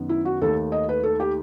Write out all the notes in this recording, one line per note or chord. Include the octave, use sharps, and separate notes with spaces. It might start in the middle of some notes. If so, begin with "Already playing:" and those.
Already playing: F#2 D#3 B3
E4
F#4
D#2 D#3 A3 A4
D#5
B4
A4
G4